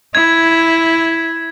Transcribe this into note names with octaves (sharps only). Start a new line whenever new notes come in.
E4 G#6